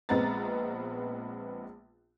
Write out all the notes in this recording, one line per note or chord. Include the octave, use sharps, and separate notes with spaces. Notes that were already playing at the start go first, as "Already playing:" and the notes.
A#1 G#3 B3 C4 A#5 A6